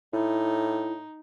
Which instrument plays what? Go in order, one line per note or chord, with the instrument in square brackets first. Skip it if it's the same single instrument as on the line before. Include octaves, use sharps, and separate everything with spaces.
[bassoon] A2 [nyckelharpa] D#4 [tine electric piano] E4